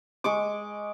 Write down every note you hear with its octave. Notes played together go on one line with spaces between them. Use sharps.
G#3 C#6 D6